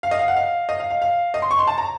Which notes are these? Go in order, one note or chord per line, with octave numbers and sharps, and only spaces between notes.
F5
D#5
F5
F#5
F5
D#5
F5
F5
F5
D#5
C6
C#6
C6
A5
A#5